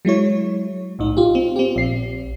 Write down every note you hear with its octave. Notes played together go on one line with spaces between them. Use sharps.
F#3 G#3 E4 C#5
B1 A2 D#4
F4 G4
C4
C4 G4
A#1 C7